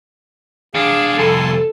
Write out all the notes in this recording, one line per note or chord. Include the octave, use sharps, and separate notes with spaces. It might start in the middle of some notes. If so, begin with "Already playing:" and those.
E2 D4 G#4 F5
C2 F2 A4 G#5 A5 C6